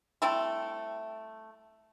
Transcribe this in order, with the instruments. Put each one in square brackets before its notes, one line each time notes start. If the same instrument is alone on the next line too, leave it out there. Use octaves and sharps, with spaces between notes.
[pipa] G3 A3 C4 E4